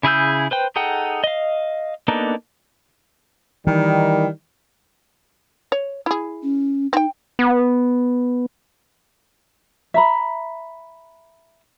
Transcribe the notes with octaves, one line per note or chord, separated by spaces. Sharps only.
C#3 E4 G#4 E6 G6
B4 C5 G5
D#4 G#4 A4 F#5 G5
D#5 F5
A#3 B3 D4 D#4 A4
D#3 E3 G3
C#5
E4 G#4
C#4
C4 D#4 G5
B3
E5 A#5 B5